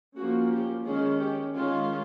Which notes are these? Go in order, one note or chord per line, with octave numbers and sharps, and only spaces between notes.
F3 A#3 C#4 F#4
G4
D#3 G#3 C#4 G#4
G4
D#3 G#3 C#4 F4